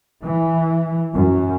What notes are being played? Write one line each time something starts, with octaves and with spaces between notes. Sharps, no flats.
E3
F#2